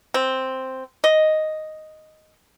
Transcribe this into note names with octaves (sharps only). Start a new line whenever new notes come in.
C4
D#5